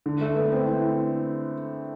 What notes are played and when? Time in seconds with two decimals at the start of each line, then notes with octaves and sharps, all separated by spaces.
0.06 D3
0.21 A3
0.36 B3
0.52 C4
0.66 E4